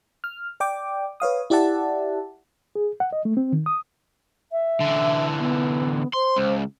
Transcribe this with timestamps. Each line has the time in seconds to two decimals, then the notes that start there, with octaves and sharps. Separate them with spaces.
0.24 F6
0.60 D5 G5 D6
1.20 B4 C#5 F5 D#6
1.50 E4 G4 D5 E5 F#5 A5
2.75 G#4
3.00 F#5
3.12 D#5
3.25 A3
3.37 C4
3.53 D#3
3.66 D#6
4.51 E5
4.81 D3 E3
5.39 B3
6.13 C5 C6
6.36 C#2